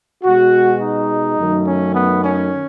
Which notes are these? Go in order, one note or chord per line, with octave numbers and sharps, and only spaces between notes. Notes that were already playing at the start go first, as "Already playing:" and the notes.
B2 G#3 F#4
D#4
F#2 D#3 F#3 A3
C#4
B3
C#4